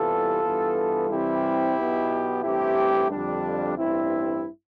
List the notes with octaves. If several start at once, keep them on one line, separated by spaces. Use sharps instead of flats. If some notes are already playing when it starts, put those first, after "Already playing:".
Already playing: C2 C3 E3 G3 B3 F4 A4
G2 E3 B3
C2 C3 E3 G3 C4 E4 G4
B1 B2 B3
A1 G2 E3 A3 C4 E4 G4
F2 D3 G3 D4
A1 G2 E3 G3 C4 E4